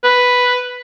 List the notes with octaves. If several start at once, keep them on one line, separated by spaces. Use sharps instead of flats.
B4